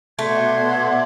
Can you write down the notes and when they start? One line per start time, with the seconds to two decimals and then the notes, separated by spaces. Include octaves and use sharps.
0.19 B2 A3 D5 F#5 A5 C6 G#6
0.59 B3 A4